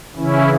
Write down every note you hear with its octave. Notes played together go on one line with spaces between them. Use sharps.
C#3 E3 C#4 E4